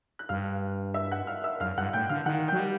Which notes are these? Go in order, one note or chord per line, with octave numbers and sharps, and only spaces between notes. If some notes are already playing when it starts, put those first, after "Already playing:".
F#6
G2 F5 F6
E5 E6
F#5 F#6
F5 F6
E5 E6
F#2 F5 F6
G2 F#5 F#6
A2 G5 G6
D3 F5 F6
D#3 F#5 F#6
F#3 G5 G6
G3